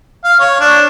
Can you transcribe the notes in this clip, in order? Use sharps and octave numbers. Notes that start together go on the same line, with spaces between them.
F5
C#5
D4